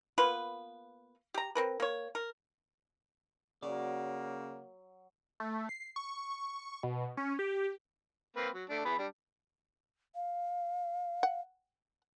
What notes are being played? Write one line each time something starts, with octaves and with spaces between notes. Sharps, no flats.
A#3 B3 F4 B4
G4 A#5
C4 A#4 B4
A#3 C#5
A#4
C#3 F#3 A#3 D5
A3
C7
C#6
B2
C#4
G4
A#3 C4 B4
F#3
A3 D4
B3 E4 G#4
G3 D4
F5
F#5